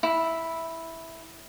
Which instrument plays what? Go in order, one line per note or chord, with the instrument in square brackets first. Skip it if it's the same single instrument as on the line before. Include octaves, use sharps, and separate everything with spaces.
[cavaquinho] E4